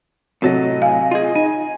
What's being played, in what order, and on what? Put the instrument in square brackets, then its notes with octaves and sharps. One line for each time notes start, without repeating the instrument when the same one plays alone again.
[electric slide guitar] A2 A4 D#5 [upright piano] C3 F#3
[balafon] F5 [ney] G#5
[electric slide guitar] F4 G#4 [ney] D#5
[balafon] D#4 [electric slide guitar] G#5